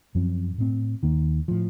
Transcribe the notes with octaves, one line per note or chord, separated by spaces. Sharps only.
F#2 F3 C4
A2 A3 C4
D#2 D#3 A#3
A2 F3